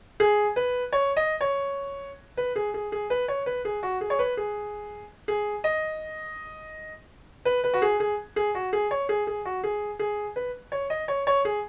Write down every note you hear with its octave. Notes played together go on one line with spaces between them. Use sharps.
G#4
B4
C#5
D#5
C#5
B4
G#4
G#4
G#4
B4
C#5
B4
G#4
F#4
G#4
C#5
B4
G#4
G#4
D#5
B4
B4
F#4
G#4
G#4
G#4
F#4
G#4
C#5
G#4
G#4
F#4
G#4
G#4
B4
C#5
D#5
C#5
C#5
G#4